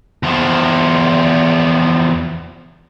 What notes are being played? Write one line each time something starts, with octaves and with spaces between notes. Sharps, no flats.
E2 F3